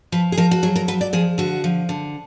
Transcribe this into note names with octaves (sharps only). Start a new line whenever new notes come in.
F3 B4
G#4
F3 A#4
F#4
F#3 G#4
A#4
F#3 B4
D5
F3 G#4
D3 F#4
F3
D3